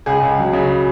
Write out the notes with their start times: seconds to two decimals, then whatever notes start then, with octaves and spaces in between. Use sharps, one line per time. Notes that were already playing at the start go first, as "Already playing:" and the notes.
0.06 C#2 G#4
0.23 C#2
0.39 F#3
0.53 C#3